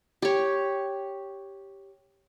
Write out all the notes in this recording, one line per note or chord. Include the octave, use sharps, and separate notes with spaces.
G4 C#5